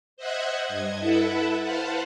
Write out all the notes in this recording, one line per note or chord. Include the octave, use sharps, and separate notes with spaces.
C5 D#5 E5 F#5 F#6 G#6
G2 D#5 G#6
E4 A4 B4 E5 F#5
B4 C5 F5 F#5 A5